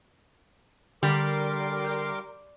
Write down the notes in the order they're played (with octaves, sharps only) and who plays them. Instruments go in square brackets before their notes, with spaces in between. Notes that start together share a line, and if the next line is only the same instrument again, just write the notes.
[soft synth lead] D3 [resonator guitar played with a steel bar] G3 [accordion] A#4 C6 D6